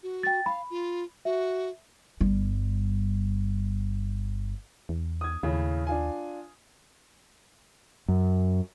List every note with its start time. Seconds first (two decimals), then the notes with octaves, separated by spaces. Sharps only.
0.03 F#4
0.23 G5 A6
0.46 F5 B5
0.70 F4
1.25 F#4 E5
2.21 G1 G3
4.89 E2
5.21 D#6 G#6
5.43 D#2 A2 C#3
5.87 D4 F4 G#5
8.08 F#2